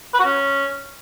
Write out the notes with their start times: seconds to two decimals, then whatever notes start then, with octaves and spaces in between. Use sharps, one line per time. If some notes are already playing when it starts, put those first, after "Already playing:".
0.14 B4
0.20 F#4
0.25 C#4